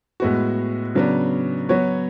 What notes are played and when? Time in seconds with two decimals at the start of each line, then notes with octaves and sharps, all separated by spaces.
0.20 A2 G#3 B3 F#4
0.95 C#3 F#3 B3 D4
1.69 F#3 B3 F#4 C#5